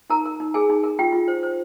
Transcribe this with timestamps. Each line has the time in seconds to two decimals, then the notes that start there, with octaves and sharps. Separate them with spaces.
0.10 D#4 A#4 A#5
0.25 A#4
0.40 D#4
0.54 G#4 A#4 G#5
0.70 D#4
0.83 A#4
0.99 F4 G4 G5
1.12 F4
1.28 C5
1.43 C5